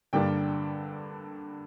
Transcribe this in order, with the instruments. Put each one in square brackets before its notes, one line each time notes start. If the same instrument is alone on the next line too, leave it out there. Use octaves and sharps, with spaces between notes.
[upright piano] G2 D3 G3 A#3 D4 G5